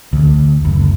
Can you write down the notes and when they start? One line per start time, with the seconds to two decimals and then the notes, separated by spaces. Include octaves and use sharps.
0.13 D2
0.65 F#1